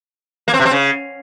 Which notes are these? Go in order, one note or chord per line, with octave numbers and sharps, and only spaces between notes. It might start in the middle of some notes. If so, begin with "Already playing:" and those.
A#3
C4
C3
C4
C#3